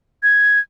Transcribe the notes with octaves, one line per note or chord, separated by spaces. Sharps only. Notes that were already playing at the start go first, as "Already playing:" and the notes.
G#6